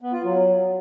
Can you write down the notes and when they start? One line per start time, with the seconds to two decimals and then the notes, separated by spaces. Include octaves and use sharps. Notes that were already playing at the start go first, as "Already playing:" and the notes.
0.02 B3
0.13 F4
0.24 F#3